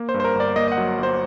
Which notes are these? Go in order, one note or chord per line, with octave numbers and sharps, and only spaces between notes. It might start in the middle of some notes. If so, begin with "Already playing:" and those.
Already playing: A#3
C5
G2
C5
A#4
G1 D5
A#3 D#5
D#5
F#5
F#3
G1 C5